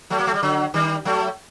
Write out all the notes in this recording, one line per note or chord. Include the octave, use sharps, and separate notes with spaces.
F#3 A3
A#3
A3
G3
D3 F#3
D#3 G3
F#3 A3